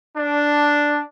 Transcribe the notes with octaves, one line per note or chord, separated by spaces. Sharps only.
D4